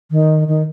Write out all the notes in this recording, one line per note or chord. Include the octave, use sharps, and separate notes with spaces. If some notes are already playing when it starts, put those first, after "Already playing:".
D#3
D#3